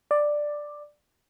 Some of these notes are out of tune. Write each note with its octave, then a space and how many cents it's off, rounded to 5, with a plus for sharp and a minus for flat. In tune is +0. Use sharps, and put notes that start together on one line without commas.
D5 +5